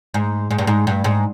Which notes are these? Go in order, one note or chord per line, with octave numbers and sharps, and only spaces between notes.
G#2
G#2
G2
G#2
G2
G#2